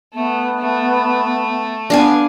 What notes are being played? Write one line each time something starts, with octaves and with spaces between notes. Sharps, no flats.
A3 B3
A3
B3 D4 F5 G#5